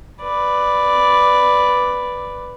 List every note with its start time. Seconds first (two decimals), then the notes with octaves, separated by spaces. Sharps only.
0.22 B4 D5